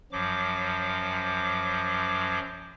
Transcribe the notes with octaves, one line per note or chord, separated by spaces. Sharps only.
F#2 F3 F#3 D6